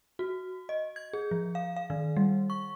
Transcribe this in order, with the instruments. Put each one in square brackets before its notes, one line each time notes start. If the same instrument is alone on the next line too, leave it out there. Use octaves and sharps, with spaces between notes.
[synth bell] F#4
D#5
G#6
G#4
F3
F5
F5
D#3
G3
C#6